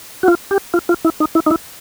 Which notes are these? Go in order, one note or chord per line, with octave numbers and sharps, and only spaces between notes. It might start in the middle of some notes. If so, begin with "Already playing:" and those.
F#4
F4
G4
F4
F4
E4
D#4
E4
D#4
E4